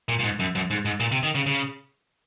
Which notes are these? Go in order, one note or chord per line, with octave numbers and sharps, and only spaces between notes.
A#2
A#2
G#2
F#2
F#2
G#2
G#2
A#2
C3
D#3
C#3
C#3